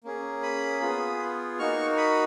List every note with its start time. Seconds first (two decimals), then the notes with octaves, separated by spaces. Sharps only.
0.04 A#3 C#4 G#4
0.42 B5 D#6
0.81 B3 F4 G#4
1.59 A#3 D#4 F#4 C#6 F6
1.97 B5 D#6